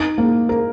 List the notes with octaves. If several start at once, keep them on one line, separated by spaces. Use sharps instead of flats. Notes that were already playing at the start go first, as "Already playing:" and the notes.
Already playing: D#4
A#3
A#4